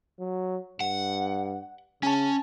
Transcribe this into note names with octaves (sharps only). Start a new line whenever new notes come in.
F#3
G2 F#5
C#3 C#4 G#5 A5